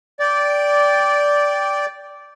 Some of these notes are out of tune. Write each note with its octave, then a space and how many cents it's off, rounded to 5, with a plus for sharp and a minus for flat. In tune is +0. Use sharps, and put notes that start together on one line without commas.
D5 -10 G5 +0